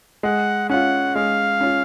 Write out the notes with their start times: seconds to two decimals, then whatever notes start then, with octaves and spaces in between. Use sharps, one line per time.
0.23 G#3 F#5
0.70 C#4 F4 F#5
1.15 G#3 F5
1.61 C#4 F4